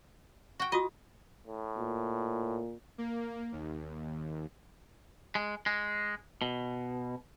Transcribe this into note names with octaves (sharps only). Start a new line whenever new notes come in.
F#4 G5
F4 F#4 D#5 D#6
A2
A#2
A#3
D#2
G#3
G#3
B2